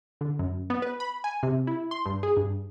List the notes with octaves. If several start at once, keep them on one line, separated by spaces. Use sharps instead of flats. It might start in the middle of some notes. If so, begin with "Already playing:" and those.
D3
F#2
B3
B4
B5
G#5
C3
E4
C6
G2
G#4
G2